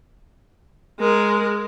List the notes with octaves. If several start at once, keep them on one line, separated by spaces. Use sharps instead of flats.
G#3 A#4